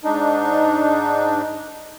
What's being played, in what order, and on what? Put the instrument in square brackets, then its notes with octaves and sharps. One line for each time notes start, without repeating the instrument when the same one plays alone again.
[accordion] G#2 D4 D#4